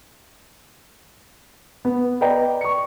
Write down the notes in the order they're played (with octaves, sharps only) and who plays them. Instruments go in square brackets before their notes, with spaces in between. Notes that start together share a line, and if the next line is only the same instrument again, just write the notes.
[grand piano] B3
B4 D5 D#5 G5 A#5
C#6 C#7